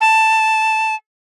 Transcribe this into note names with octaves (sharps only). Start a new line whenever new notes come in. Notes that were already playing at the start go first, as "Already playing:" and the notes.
A5